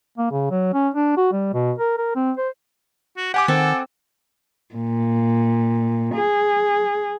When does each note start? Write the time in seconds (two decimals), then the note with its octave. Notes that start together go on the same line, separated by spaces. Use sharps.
0.18 A#3
0.31 C#3
0.51 F#3
0.73 C#4
0.94 D4
1.17 F#4
1.32 G3
1.54 B2
1.78 A#4
1.98 A#4
2.16 C4
2.37 C5
3.17 F#4
3.34 G4 F#5 G#5 D6
3.48 D#3 C4 A4
4.75 A#2
6.14 G#4